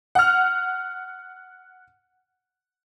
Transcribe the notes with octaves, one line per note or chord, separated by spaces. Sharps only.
F#5 F6